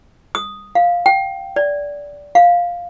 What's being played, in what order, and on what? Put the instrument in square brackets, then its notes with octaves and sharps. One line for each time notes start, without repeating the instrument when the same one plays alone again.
[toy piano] D#6
F5
G5
D5
F5